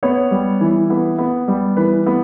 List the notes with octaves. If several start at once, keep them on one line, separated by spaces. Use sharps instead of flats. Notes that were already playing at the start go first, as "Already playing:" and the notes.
B3 C#5
G3
E3
B3
B3
G3
E3 B4
B3